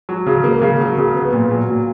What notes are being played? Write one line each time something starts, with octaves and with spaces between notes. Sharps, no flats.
F#3
C#3
A#3
C#3
F#3
C#3
B3
A#2
F#3
A#2